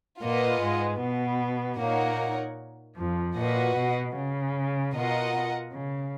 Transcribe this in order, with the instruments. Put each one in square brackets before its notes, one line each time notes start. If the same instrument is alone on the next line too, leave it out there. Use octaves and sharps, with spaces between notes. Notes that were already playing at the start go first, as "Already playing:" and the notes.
[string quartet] A#2 A#3 [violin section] F4 B4 D#5 F#5
[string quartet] G#2 G#3
B2 B3
[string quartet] A#2 A#3 [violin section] D#4 A#4 C#5 F#5
[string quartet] F2 F3
[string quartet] A#2 [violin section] F#4 B4 D#5 F#5
[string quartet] B2
C#3
[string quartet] B2 [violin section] F4 A#4 D#5 F#5
[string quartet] C#3